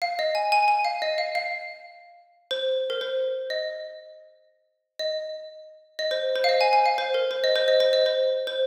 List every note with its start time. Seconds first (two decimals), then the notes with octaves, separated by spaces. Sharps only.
0.02 F5
0.19 D#5
0.35 G#5
0.52 G#5
0.68 G#5
0.85 F5
1.02 D#5
1.18 F5
1.35 F5
2.51 C5
2.90 A#4
3.01 C5
3.50 D#5
4.99 D#5
5.99 D#5
6.11 C5
6.36 C5
6.44 F5
6.49 D#5
6.61 G#5
6.73 G#5
6.86 F5
6.98 C5
7.14 A#4
7.31 C5
7.44 D#5
7.56 C5
7.68 D#5
7.80 C5
7.93 D#5
8.06 C5
8.47 C5